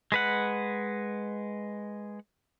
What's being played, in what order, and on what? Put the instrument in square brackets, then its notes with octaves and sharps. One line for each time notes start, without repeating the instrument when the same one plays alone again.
[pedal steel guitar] G#3 B4 F#5